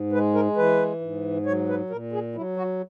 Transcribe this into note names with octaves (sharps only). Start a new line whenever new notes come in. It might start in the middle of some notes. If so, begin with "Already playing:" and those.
Already playing: G#2
G#3 B4
A#4
E3 B4
G#2
F#3 C#5
B4
A#2 A#4
G#4
F#3 E4
F#4